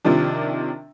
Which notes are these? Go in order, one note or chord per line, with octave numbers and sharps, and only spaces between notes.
C3 D#3 F3 D4